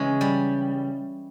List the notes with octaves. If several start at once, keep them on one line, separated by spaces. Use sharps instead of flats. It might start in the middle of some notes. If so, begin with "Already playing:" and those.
Already playing: C#3 E3 G#3
G3